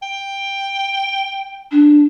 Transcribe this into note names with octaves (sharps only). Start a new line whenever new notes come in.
G5
D4